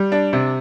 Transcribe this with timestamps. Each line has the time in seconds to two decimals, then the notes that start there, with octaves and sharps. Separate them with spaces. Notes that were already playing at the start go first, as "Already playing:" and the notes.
Already playing: G3
0.12 D4
0.33 C3